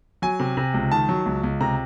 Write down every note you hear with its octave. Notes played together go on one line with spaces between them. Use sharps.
F#3 G#5
C3
C3
C#2
D#3 A5
F#3
C#2
C#2
C3 A#5